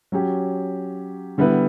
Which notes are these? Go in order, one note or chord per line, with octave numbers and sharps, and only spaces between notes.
F#3 C#4 G4
D3 G3 B3 E4 B4